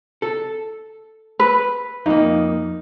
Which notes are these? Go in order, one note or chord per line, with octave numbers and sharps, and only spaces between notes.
A4
B4
F2 A#3 D#4